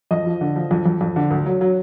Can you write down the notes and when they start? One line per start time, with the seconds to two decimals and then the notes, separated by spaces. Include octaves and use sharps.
0.11 F2 D#5
0.26 F3
0.41 D3
0.56 F3
0.71 F2
0.86 F2
1.01 F2
1.16 D3
1.31 D2
1.46 F#3
1.61 F#3